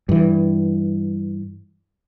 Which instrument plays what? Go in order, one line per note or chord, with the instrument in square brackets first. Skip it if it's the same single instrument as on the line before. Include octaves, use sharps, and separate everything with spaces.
[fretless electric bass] G2 E3